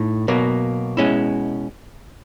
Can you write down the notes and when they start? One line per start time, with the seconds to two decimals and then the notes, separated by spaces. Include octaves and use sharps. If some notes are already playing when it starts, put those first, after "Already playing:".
Already playing: A2 D#4
0.28 B2 F#3 A#3
0.97 B2 G#3 C#4 E4